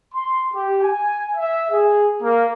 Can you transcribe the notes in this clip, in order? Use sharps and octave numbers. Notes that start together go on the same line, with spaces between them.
C6
G4
G#5
E5
G#4
A#3